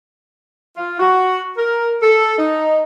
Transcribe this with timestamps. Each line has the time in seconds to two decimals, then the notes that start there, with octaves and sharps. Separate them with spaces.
0.76 F4
0.99 F#4
1.57 A#4
2.02 A4
2.38 D#4